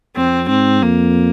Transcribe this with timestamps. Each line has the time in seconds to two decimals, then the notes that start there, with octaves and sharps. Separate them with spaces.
0.16 F2 C4
0.49 G#2 C4
0.82 F2 A#3